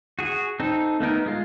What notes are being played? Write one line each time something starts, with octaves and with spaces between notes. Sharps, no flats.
F#4 G#4
C4 D#4 A4
A3 B3 D#4 A#4
G#3 F4